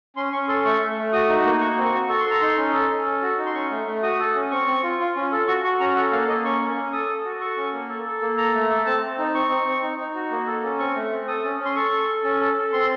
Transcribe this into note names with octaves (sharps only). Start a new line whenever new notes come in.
C#4 C6
C#4 C#6
A4 C6
A3 C#6
A3
A3
F#4 D#6
D#4
A#3
F#4 C#6
C4
C#6
F#4
A4 C#6
C6
A4 A#5
D#4 C6
C#4
A4
C#4
A4
F#4
D#4
C6
C#4 C#6
A3
A3
F#4 D#6
A4
C#4
C4 C#6
C4
F4
F4
C#4
A4
F#4 C#6
F#4 C#6
C#4 A#5
A4 F#5
A#3 F5
A#3 D#5
C#4 C#6
C#4
C#4
A4 D#6
A4
F#4
A4 C#6
C#4
A#3
A4
A4
A#3
A4 A#5
A3
A4
C4 A5
C4
D#4
C4 C#6
C4
C4
D#4
D#4
F#4
A#3
A4
C#4
C4 C#6
A3
C4
A4 D#6
C#4
C#4
C6
A4 C#6
A4
A4
C#4
A4
A4
C4 C6